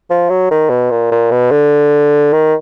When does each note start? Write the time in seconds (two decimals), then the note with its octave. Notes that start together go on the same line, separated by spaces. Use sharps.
0.10 F3
0.30 F#3
0.51 D#3
0.70 B2
0.91 A#2
1.11 A#2
1.31 B2
1.51 D3
2.33 D#3